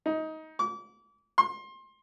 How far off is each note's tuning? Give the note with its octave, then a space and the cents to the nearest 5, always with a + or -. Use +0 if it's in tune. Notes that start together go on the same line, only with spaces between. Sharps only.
D#4 +20
D6 -35
C6 +25